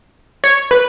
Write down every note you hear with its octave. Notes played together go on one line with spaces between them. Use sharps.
C#5
B4